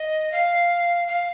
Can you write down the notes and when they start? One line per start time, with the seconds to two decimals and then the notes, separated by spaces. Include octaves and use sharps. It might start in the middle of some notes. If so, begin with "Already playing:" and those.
Already playing: D#5
0.32 F5
1.08 F5